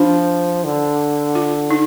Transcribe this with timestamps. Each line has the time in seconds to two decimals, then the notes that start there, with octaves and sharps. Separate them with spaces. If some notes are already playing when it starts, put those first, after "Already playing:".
Already playing: F3 D4
0.65 D3
1.35 F4
1.71 D#4